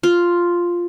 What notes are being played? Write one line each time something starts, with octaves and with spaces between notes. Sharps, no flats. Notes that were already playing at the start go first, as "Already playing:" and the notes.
F4